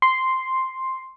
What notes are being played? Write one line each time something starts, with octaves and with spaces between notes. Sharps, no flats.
C6